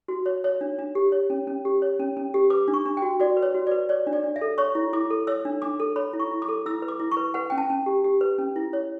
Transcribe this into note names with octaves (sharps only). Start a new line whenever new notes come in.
F#4
C#5
C#5
D4
D4
G4
C#5
C#4
C#4
G4
C#5
C#4
C#4
G4
B4 D6
D4
C#6
D4
G5
F#4
F#4 D5
B4
C#5
F#4
B4 D5
C#5 D5
D4
D5
D4
E5
A4
C#5 C#6
E4
E4 D6
A4
C#5 E6
D4
D4 D6
A4
C#5 B5
E4
C#6
E4
D6
A4
E4 E6
B4
D6
E4
C#6
B4
B4 F#5
C#4 G5
A5
C#4
G4
G4
B4
C#4
E4
C#5